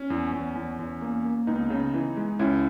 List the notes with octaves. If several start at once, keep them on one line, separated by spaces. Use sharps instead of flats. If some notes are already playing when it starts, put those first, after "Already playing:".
Already playing: C#4
E2
E2
E2
E2
A#3
A#3
C#2 B3 D#4
C#3
E3
G#3
C#2 C#4 E4